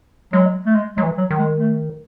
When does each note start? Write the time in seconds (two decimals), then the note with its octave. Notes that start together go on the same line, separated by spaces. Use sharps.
0.33 F#3 G#3
0.66 A3
0.75 G#3
0.96 F#3 G#3
1.03 E3
1.18 F#3
1.31 D#3
1.39 G#3
1.59 A3